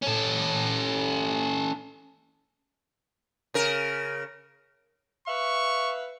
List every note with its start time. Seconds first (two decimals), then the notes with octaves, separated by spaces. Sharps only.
0.02 C#4 A4
3.54 C#3 A#4
5.28 B4 E5 F5 C#6